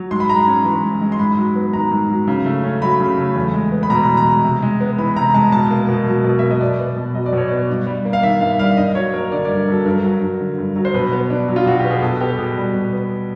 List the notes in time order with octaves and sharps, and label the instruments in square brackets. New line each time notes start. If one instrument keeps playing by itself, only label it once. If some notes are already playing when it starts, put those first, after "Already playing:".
Already playing: [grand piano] F#3
G#2 C6
B5
G#3 A#5
B5
C#4
E3
G#2
G#3
C6
G#2 B5
F#3
B3
D#3 A#5
G#2
F#3
C#3
A3
C#4
F#3 B5
C#3
A3
E2
G#3
B3
B5
B2 A#5
E2 B5
A#5
G#3
C3
G#3
B3
E3 B5
C3 A#5
G#3 A5
B2 A5
A#3
B2
F#3
B2
A#3 E5
D#5
B2 D5
B3
B2
F#3 D#5
D5
B2 C#5
B3 D5
G2
G3
A#3
F5
D#3 E5
G2 F5
G3 F5
G2 D#5
F#3 C#5
A#3 A#4
D3 D5
G2 D5
F#3 A4
G2 A#4
F#3
G2
D3
G2
F#3
C5
B2 B4
B3
D4
F#3
F4
B2 F#4
G4
B3
G#4
B2 A4
B3 G4
B2 G#4
G3
B2
B3